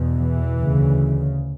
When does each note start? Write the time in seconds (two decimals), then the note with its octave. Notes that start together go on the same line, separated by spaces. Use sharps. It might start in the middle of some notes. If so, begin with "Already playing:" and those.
Already playing: E2 B2
0.17 E3
0.59 D2 C#3